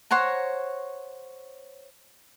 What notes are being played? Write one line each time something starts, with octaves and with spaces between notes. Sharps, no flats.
C5 C#5 F#5 A#5